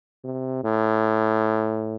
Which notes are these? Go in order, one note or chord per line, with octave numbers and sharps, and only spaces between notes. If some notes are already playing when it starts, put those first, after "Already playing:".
C3
A2